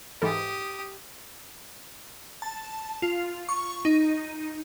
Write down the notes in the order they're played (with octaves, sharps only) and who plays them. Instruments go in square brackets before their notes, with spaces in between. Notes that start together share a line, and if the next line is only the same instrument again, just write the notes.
[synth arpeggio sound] G#2 E3 A4 [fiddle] G4 D#6
[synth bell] A5
F4
C#6
D#4